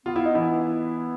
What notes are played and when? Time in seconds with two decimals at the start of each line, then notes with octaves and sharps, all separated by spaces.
0.06 B3 F4
0.16 E4
0.25 D#4
0.35 E3 E4